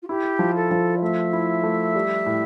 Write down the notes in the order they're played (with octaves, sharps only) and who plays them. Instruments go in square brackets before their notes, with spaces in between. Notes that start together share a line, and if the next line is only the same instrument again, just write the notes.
[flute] F4
[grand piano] E4 [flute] G4
[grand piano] F3
[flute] A4
[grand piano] F3
[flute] D5
[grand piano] A3 [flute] E5
[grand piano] E4
A3
G3
A2